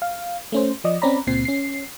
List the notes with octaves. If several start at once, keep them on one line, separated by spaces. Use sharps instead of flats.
F5
A3 C#4 C5
F3 D5 D#5
C4 C#4 D5 A#5 B5
C#2 A#2 C4 C7
C#4 C7